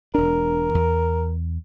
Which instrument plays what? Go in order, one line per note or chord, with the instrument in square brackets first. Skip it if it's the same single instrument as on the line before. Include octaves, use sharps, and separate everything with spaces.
[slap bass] E1 D4 [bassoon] A#4
[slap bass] E2